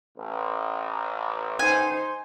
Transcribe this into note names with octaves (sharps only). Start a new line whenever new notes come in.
A1
D#4 C5 G#5